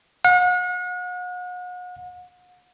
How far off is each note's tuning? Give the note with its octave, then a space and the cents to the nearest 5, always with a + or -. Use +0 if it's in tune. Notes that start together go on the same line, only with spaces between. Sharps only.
F#5 -40